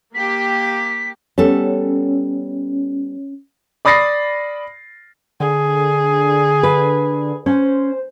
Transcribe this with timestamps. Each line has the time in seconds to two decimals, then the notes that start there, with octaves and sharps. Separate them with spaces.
0.15 A#3 G4 B6
1.38 G3 B3 C#4 A4
3.85 D5 B5 D#6 A6 A#6 C7
5.40 D3 G#4
6.63 B4
7.46 C#4 C5